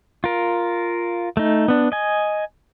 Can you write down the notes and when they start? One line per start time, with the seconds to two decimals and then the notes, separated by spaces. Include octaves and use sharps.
0.24 F4 A#4
1.37 A3 D#4
1.68 B3 D4
1.92 D#5 G#5